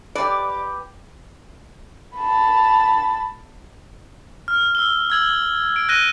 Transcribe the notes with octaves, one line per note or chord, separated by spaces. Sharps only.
G4 B4 D5
A5 B5
F6
E6 G7
E6 G#6 F#7
D7
F#6 A#6 D#7 G7